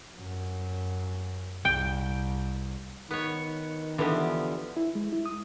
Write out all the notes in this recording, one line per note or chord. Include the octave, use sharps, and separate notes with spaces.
F#2
C2 G5
D#3 B3 C#5
D3 E3 F3 B3 G4
E4
G#3
E4
D#6